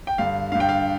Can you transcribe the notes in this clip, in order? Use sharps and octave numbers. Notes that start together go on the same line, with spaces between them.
G5
G2 D3 F5
G2 D3 F5
G5
F5